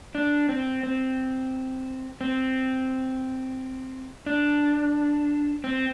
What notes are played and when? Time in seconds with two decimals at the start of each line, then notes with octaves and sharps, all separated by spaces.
0.15 D4
0.49 C4
0.83 C4
2.21 C4
4.26 D4
5.64 C4